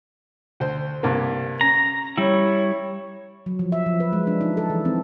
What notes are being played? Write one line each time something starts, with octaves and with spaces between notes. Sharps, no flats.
D2 C5
C2 G2 A#3
C#4 A#5
G3 E4 C#5
F#3
F3
E5
F3
B4
G#3
D4
D#4
A4
E3
C4